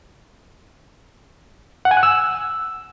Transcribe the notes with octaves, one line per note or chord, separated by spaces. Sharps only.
F#5
G#5
F#6
E6